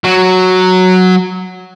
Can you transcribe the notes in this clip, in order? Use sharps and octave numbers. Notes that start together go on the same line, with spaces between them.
F#3